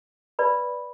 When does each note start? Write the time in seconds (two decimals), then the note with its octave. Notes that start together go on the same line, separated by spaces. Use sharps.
0.39 B4 D5 B5